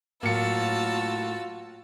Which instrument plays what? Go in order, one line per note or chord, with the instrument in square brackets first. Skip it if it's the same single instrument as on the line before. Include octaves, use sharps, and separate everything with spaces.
[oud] A2 F#3 [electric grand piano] A#3 C#7 [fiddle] F4 F#4 [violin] A5 E6